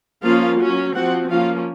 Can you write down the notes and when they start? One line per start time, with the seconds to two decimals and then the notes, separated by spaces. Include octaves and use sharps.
0.23 F3 A#3 C#4 F4 F5
0.59 F#3 C#4
0.95 F3 C4 F#4 F#5
1.31 F3 A#3 C#4 F4 F5